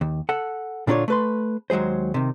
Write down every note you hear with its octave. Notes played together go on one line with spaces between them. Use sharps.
D#2
A4 F#5
A#2 D3 D4 F4 C5 C#5
A3 B4 C6
D#2 F#3 G#3 G#4 C5
C3 D#3